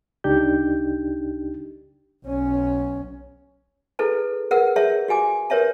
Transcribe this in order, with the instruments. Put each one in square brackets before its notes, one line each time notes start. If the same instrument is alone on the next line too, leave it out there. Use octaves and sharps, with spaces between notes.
[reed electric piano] C#2 D4 D#4 G4 G6
[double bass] B1 C#4
[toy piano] E4 G#4 A4 B4 A5
G#4 A#4 B4 F#5 E6
G#4 C#5 E5 A5
F#4 G4 G#5 D6
G4 A#4 B4 C#5 E5 A5